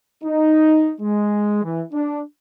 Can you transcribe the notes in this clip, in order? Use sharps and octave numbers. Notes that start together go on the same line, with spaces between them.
D#4
G#3
E3
D4